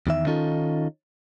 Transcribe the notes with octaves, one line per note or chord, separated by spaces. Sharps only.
E2 D#3 E5
D#3 C#4 D#4 F4 A4